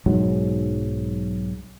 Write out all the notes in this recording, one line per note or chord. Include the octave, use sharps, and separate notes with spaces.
B1 G#2 F#3